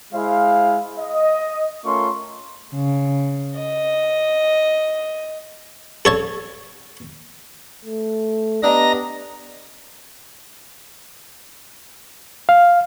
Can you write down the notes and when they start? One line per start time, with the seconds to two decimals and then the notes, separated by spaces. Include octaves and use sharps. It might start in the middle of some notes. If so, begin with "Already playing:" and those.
0.13 G#3 E4 G#4 C5 F5
1.00 D#5
1.85 A3 C#4 F4 A#4 C6 C#6
2.74 C#3
3.58 D#5
6.05 A4 C#5 A5
7.85 A3
8.63 B3 D4 G4 D5 D#5 A#5 A#6
12.49 F5